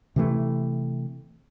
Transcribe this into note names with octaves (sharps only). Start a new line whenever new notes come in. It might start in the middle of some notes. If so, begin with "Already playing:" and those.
C3 E3 A3